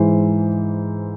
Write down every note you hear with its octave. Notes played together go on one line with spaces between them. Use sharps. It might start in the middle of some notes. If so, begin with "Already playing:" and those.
Already playing: G#2 E3 C5